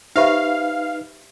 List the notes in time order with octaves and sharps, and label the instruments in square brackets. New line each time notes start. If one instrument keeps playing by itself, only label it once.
[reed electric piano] D#4 B4 [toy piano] G4 C5 E5 [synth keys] F5